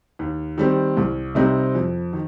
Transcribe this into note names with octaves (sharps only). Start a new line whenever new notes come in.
D#2
D#3 G3 C4
C2
C3 G3 C4 D#4
F2
D#3